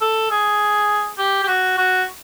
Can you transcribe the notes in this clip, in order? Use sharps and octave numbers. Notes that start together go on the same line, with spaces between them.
A4
G#4
G4
G4
F#4
F#4